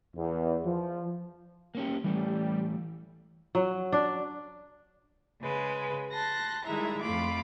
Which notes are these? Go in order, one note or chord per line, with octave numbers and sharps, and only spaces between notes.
E2
F3
A#3 C#4 G4
E3 G3 A3
F#3
D4
C#3 G#3 B4
A5 C6 F#6 A#6
D#3 G3 G#3 E4 E5 A#5
F2 A3 F4 F5 B5 D6